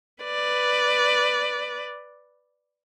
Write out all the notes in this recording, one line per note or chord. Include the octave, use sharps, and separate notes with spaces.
B4 D5